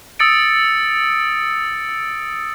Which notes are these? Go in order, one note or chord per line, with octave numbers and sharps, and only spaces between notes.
D#6 E6 A6 C#7 D7